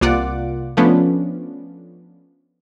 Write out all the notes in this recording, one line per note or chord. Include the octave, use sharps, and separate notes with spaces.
C2 A#3 F4 D5 F#5 D6
F3 A3 B3 C#4 D4